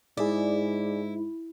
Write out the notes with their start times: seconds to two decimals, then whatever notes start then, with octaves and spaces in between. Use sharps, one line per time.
0.17 G#2 E4 G#4 D5